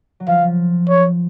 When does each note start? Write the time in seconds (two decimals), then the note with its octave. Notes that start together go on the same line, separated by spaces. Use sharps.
0.20 F#3
0.27 F3 F5
0.88 C#5